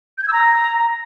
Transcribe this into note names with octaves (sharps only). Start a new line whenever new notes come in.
G6
G#6
E6
A#5